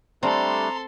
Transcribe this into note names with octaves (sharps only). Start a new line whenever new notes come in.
G3 A3 C4 D4 A4 A#5 C6